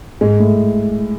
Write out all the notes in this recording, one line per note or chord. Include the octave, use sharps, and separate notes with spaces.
G#2 G#3
A2